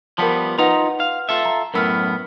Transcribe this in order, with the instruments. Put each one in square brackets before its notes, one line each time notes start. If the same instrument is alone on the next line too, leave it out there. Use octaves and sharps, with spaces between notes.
[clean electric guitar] F3 G3 B3 [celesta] A#4 A5
[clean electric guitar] D#4 F4 A#5 [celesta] B4 F#5
[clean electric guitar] F5
F4 A4 E5
[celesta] A#5
[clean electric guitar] F#2 A2 B3 [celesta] A#4 E6 F6